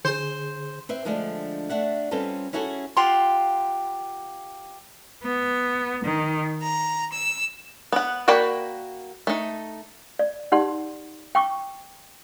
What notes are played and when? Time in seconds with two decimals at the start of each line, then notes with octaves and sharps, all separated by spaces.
0.05 D3 G#4 C5
0.89 C4 B4 E5
1.05 D3 F3 G#3 A3 D4
1.70 A3 D4 E5 F#5
2.11 G3 C4 C#4 F4 A4 B4
2.53 C#4 E4 F#4 G#4 A4 C#5
2.97 F4 G4 F#5 C6
5.24 B3
6.05 D#3
6.62 A#5
7.12 E6
7.92 B3 F#5
8.28 A#3 F#4 D5 G5 B5
9.27 A3 D#4
10.19 D5
10.52 D#4 G4 D5 F#5 C6
11.35 G5 C#6 D6